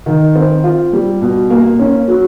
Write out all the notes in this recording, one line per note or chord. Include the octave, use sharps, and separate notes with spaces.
D#3
C4
F4
G3
B2
A#3
C#4
F#3